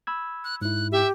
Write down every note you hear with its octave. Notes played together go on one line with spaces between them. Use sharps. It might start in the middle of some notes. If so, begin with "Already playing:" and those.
B5 E6 G#6
F#6
G#2 E4 F#6
G4 E5